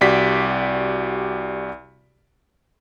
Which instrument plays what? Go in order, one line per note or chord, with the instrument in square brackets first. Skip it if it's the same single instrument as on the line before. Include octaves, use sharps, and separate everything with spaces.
[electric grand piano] C2 F#4 G4 D5 B6